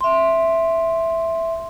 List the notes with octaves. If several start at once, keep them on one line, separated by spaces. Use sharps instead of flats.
E5 C6